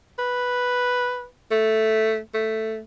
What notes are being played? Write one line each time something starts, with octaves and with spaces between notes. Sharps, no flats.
B4
A3
A3